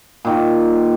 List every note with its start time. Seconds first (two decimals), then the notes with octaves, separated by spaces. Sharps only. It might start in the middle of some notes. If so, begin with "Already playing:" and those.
0.25 A#2 D#3